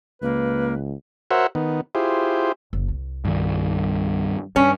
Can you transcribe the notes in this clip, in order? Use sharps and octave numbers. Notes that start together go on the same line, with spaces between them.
C#2 A#3 B4
F#4 A#4 C5 C#5 E5 F#5
D#3 B3
E4 F4 G4 G#4 C5
F#1
C2
G2 D#3 G3
G2 D#3 C#4